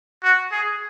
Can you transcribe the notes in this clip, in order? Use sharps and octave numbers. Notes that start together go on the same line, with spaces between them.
F#4
G#4